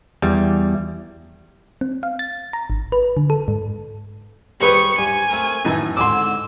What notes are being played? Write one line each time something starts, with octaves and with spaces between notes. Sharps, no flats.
E2 G3
C4
F5
A6
A#5
G#1
B4
D3
A4
G#2
G3 G4 G#4 B4 C5 C#6 D#6
G2 G#5
A3 C4 A#4
F#2 A2 E3 D#4
G#2 D3 C4 C6 D6 E6